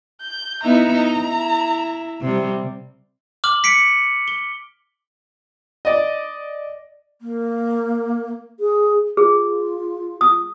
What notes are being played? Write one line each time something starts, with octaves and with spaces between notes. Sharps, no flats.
G6
B3 D#4 E4 A#5
D#4
E4
C3 G3
D6 F6 F#7
B6 C#7 D7
G7
D5 D#5
A#3
G#4
F4 G#4
D#6